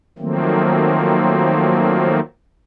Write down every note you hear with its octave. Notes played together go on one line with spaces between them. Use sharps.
D#3 F3 F#3 A3 A#3 C4